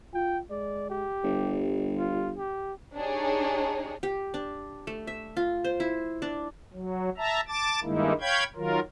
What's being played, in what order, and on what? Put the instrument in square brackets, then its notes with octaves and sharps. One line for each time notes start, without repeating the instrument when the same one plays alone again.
[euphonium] F4 [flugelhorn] G5
[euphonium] G#3 [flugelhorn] D5
[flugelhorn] G4
[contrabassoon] G1 [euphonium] G3
[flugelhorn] F4
G4
[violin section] D4 D#4 G4 G#4 C#5
[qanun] G4
D4
A3
E5
F4
C5
E4
D4
[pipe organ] F#3
E5 A5 A#5
A5 D6 A6
G2 D#3 G#3 A#3 D#4 E4
C#5 F5 G5 B5 G6 G#6
D#3 F#3 F4 A#4